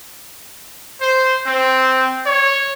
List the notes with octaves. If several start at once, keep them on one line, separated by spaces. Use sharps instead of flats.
C5
C4
C#5